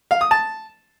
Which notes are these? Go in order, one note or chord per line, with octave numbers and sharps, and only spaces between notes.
F5
D#6
A5